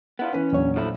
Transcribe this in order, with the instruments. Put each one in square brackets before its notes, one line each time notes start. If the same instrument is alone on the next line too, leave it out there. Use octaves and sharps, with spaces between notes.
[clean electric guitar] B3 E4 F4
[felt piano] E3 B4 C#5 [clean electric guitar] C#4
[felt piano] A#1 F#3 [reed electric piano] E2 C#5
[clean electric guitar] F3 A3 E4